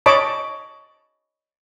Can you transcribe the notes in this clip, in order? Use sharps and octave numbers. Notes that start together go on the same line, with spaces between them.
C#5 D#5 A5 B5 D6